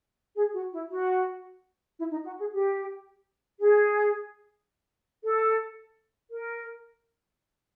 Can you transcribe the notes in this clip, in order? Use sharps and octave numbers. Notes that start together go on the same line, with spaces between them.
G#4
F#4
E4
F#4
E4
D#4
F#4
G#4
G4
G#4
A4
A#4